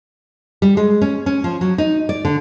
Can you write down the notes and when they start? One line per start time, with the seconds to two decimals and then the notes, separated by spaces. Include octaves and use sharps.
0.62 G3
0.77 G#3
1.02 C#4
1.26 C#4
1.44 F3
1.61 F#3
1.78 D#4
2.09 D5
2.25 D3